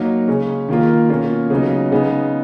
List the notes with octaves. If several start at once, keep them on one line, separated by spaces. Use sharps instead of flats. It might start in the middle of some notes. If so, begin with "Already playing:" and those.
Already playing: F#3 A#3 D#4
C#3 G#3 C#4
D#3 A#3 F4
B2 A#3 C#4 F4
C#3 F#3 B3 D#4
C#3 G#3 B3 D#4